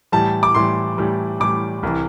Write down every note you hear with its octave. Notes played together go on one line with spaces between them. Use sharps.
A2 E3 G3 A5
D6
A2 E3 G3 C6
A2 E3 G3
A2 E3 G3 D6
C2 C3 E3